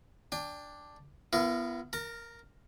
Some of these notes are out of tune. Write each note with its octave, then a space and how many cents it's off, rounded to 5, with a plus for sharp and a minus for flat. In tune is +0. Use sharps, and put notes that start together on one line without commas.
D4 +0 G5 +30
B3 +0 E4 +45 A#4 +0
A#4 +0 A#5 -45